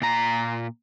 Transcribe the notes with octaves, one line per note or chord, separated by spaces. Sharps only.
A#2 A#5